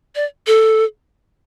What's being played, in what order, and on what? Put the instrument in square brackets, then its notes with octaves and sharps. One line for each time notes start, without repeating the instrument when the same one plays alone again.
[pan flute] D5
A4